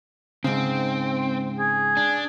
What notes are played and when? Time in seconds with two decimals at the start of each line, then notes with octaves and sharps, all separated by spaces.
0.44 G#2 C#3 C4
1.57 G#4
1.97 D4